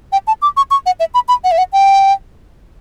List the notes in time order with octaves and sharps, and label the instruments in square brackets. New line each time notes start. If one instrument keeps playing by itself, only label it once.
[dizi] G5
A5
D6
C#6
C#6
F#5
E5
B5
B5
F#5
E5
F#5
G5